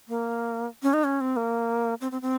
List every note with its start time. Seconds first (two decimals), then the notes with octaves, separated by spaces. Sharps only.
0.08 A#3
0.83 C#4
0.93 D#4
1.04 C#4
1.21 C4
1.36 A#3
2.01 C4
2.12 C4
2.22 C4